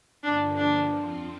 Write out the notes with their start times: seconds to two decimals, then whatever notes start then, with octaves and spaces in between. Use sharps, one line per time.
0.23 G2 D3 F3 A#3 D4
0.57 D4
0.90 F2 F3 C4 F4